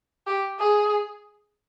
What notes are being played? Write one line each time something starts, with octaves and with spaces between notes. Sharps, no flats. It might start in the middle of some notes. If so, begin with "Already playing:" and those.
G4
G#4